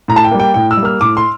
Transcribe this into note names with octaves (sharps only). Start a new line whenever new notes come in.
A2 A#5
A5
G5
G3 A#3
G5
A2 G5
E6
G3
A#3 F6
A2 D6
C6